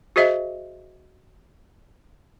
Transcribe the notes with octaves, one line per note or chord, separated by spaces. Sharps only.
F#4 G#4 C5 D#5 E5